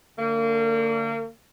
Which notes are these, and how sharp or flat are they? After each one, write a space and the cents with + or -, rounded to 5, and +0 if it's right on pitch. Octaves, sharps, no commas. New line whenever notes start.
D3 +0 A#3 -35